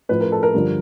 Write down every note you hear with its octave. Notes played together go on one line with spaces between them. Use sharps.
A2 F3 B4
A#4
A4
A#4
G2 D3 F3